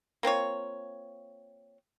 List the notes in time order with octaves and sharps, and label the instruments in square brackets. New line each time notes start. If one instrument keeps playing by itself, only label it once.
[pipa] A#3 C4 F4 C#5